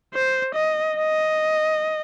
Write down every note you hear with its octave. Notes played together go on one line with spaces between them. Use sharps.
C5
D#5
D#5